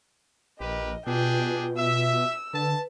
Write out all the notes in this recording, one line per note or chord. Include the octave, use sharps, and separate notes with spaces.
A#1 G4 A#4 B4 D#5
B2 D4 F4 G4 G#4 B4 G5
E5 E6
D3 B4 A5